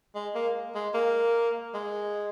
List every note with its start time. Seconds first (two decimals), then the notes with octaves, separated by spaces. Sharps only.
0.15 G#3
0.35 A#3
0.75 G#3
0.94 A#3
1.74 G#3